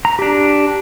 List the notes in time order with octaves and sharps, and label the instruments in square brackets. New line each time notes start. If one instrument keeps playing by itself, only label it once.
[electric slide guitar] A#5
D4 G4